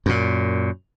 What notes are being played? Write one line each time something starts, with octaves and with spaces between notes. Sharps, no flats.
F#2 A#2